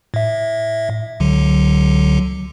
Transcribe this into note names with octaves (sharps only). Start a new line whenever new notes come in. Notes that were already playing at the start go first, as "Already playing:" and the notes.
A2 E5
C#2 D3 F#3